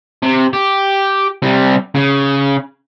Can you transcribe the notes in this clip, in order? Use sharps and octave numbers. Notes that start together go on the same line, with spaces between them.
C3
G4
C3 G3
C#3